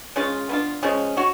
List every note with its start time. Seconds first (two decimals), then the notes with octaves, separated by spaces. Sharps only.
0.16 C#3 G#3 C#4 F4
0.49 B3 D4 F4
0.83 C#3 F3 G#3 C#4
1.17 F#4 C#5